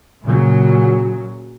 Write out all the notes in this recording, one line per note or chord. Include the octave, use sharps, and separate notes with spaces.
A#2 C#3 F#3